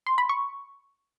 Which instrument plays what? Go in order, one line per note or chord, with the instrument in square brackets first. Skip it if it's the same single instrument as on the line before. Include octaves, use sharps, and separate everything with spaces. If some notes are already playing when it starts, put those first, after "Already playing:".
[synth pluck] C6
B5
C#6